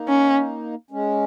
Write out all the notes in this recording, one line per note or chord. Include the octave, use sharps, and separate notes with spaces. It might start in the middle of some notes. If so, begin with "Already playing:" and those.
Already playing: A#3 D#4
C#4
G#3 C#4